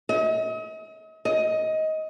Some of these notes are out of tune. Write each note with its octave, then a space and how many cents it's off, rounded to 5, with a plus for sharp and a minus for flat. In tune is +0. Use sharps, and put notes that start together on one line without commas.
D#5 +40
D#5 +15